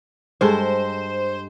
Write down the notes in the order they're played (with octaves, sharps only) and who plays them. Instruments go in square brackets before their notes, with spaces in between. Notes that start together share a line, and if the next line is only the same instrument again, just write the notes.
[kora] G2 G#3 A4 [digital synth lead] C5